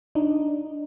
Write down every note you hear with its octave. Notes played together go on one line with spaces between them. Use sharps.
D4 D#4